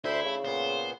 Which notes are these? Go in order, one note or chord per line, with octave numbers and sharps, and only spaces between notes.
D2 E4 C5 E5 C6
C#3 A3
A#2 B3 C5